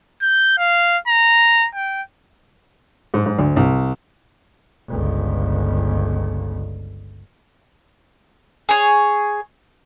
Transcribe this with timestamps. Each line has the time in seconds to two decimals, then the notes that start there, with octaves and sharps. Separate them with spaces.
0.22 G6
0.58 F5
1.08 A#5
1.75 G5
3.14 G#2
3.26 G#2
3.38 D2
3.56 C2
4.88 G1 C#2
8.69 G#4 C#5